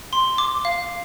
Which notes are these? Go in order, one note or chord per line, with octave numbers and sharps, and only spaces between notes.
C6
D6
F5